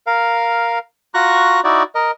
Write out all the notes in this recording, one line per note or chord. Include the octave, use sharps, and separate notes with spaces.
A#4 F5
F4 F#4 A#5 C#6 F#6
D#4 E4 F#4 D5
A#4 D#5